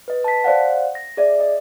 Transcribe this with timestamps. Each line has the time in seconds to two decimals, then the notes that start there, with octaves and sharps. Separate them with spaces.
0.08 B4 D#5
0.24 A5 B6
0.44 C5 D5 F5 F#5
0.95 A#6
1.17 G#4 D5 E5
1.40 D#5